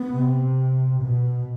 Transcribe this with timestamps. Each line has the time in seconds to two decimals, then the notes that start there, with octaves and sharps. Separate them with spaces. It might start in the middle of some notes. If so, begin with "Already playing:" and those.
Already playing: B3
0.11 C3
1.02 B2